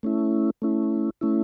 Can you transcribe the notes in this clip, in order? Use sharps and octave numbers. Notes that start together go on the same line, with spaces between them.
A3 C#4 E4
A3 C#4 E4
A3 C#4 E4